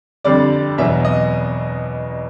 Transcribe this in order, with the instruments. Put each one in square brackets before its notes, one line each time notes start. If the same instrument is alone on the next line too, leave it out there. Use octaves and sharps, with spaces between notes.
[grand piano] F2 D3 G3 D5
E2 B2 F#3 E5
D#5